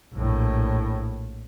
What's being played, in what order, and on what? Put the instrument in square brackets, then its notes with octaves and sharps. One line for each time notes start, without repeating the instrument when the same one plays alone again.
[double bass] A#1 A2